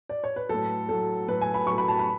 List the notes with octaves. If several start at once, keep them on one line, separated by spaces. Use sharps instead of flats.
D5
C#5
B4
A2 F#3 A4
A2 F#3 A4
A2 F#3 B4
G#5
B5
A2 F#3 C#6
B5
A5
B5